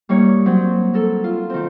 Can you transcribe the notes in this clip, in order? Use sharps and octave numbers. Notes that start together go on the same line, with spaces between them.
G3 A#3 D#4 C#5
F#3 C4
A4 A#4
F4
D#3 C4